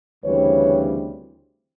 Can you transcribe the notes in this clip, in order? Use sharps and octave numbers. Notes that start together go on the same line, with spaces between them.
D2 C#3 E3 G3 C4 B4 C#5